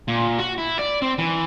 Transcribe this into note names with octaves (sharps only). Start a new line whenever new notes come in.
A#2
F#4
E4
D5
C4
E3